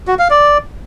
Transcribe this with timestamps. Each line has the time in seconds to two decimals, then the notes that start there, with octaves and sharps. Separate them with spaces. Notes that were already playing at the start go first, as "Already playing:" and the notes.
0.07 F#4
0.19 F5
0.30 D5